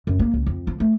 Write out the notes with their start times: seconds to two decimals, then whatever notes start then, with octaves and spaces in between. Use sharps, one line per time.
0.07 F#2
0.19 A#3
0.34 C#2
0.46 F2
0.67 F3
0.80 A3